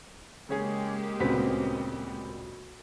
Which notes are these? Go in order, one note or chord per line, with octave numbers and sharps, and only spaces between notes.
C#3 G#3 A#3 C#4 G4 G#4
D2 A#2 C#3 B3 C4 B6